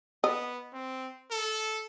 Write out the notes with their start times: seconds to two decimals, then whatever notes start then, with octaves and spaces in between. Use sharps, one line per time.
0.24 B3 D#5
0.73 C4
1.31 A4